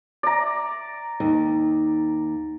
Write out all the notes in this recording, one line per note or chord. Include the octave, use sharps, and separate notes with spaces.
D5 A#5
D#2